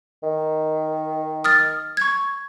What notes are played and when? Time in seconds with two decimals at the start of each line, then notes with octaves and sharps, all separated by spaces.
0.23 D#3
1.44 D#6 F6 A6
1.97 C#6 G#6